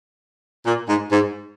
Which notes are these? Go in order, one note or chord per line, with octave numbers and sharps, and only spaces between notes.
A#2
G#2
G#2